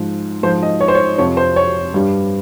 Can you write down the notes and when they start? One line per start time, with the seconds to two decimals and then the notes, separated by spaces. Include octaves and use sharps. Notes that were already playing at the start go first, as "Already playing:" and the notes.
Already playing: G#2 F3
0.43 G#2 F3 C5
0.63 D#5
0.81 C#5
0.88 C5
0.95 C#5
1.18 F2 C3 F3 C#5
1.37 C5
1.56 C#5
1.94 G2 G3